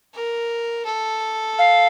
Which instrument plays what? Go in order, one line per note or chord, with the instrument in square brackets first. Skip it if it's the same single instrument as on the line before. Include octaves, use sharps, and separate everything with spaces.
[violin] A#4
A4
[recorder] F5